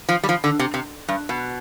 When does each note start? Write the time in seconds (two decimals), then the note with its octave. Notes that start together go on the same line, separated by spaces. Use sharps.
0.09 F3
0.23 G3
0.29 F3
0.44 D3
0.59 C3
0.74 C3
1.08 G2
1.29 B2